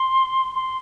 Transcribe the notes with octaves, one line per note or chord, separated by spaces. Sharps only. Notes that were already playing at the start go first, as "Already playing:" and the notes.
Already playing: C6
C6